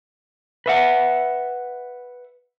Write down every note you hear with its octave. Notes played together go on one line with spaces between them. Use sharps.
B4 E5 F#5